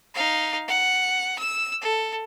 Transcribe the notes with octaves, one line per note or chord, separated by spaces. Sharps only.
D#4 F5
F#5
E6
A4